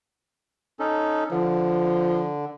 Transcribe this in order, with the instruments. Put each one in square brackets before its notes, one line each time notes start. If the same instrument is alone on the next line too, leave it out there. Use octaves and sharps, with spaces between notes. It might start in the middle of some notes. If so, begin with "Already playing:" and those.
[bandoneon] C#4 D#4 A4
[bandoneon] D3 [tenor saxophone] F3